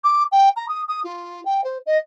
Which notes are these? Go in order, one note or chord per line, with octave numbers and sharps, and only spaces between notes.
D6
G5
A#5
D#6
D#6
F4
G5
C5
D#5